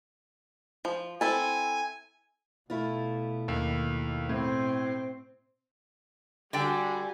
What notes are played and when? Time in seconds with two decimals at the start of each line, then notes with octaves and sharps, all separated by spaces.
0.85 F3
1.21 C4 E4 A4 G#5
2.70 B2 A3 E4 F4
3.48 D#2
4.29 A2 C4
6.53 D3 G3 F#4 D5 G5 G#5